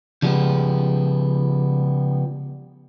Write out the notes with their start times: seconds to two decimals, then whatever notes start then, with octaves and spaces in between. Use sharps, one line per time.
0.22 C#3 F3 G3 G#3 B3